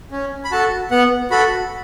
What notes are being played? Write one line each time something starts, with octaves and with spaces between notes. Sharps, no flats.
C#4
B5
F#4 A4 A5
B3 F#5
F#4 A4 B5